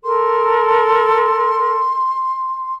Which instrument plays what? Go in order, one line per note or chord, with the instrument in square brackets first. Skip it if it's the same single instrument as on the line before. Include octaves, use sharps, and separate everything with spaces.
[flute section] A4 A#4 [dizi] C6